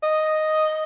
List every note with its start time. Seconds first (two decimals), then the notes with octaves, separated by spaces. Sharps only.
0.03 D#5